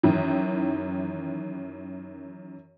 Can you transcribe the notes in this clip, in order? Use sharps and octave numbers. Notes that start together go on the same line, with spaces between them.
F#2 D#3 E3